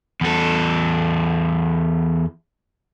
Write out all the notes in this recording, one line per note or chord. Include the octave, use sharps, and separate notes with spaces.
E2 A4